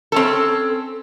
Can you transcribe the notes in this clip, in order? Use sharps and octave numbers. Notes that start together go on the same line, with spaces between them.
C4 C#4 A4